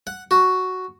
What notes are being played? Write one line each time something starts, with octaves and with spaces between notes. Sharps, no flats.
F#5
F#4